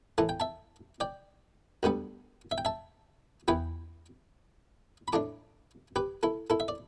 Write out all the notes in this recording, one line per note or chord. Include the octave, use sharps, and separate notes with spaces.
A2 E3 A3 A5
G5
E5 A5
D5 G5
D2 D3 G3 B3
E5
G5
E5 A5
E2 E3 B3 E4 G5 B5
B5
A2 A3 D4 A5 D6
G4 B4
E4 A4
E4 A4
E5
D5